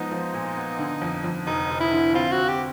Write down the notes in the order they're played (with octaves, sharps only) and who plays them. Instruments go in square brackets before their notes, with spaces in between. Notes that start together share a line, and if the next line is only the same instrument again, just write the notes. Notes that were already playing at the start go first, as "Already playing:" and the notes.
Already playing: [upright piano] F3 G#3 B3 [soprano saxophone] D#4
[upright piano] F3
A#2
B3
D3
F2
F2
[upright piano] F1 [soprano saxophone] D#4
[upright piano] F1
[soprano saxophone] E4
[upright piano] D3
[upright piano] C4 [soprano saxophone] F4
[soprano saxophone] F#4
[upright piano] C4
[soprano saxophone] G4